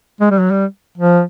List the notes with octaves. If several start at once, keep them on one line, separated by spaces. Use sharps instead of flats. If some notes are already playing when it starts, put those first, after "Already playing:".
G#3
G3
F#3
G3
F3